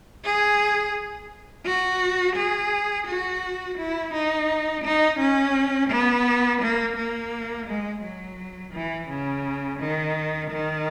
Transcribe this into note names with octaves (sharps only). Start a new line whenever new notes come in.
G#4
F#4
G#4
F#4
E4
D#4
D#4
C#4
B3
A#3
A#3
G#3
F#3
E3
C#3
D#3
D#3